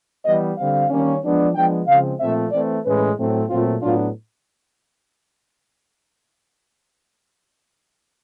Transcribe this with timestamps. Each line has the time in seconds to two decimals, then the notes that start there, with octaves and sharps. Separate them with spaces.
0.25 E3 G3 B3 D#5
0.57 D3 G3 C4 F5
0.89 D#3 G3 A#3 C#4
1.23 F3 G#3 B3 D4
1.54 F3 G#3 B3 D4 G5
1.87 C#3 F3 G#3 C4 F5
2.20 A#2 F3 A3 C4 E5
2.52 E3 A3 C4 D5
2.84 A2 E3 G#3 C#4 B4
3.17 A2 F#3 A3 C4
3.49 A#2 F#3 A3 C4 F4
3.82 A2 F#3 B3 D4 F4